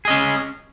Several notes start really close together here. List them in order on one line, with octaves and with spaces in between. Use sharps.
G#4 D#5 C#4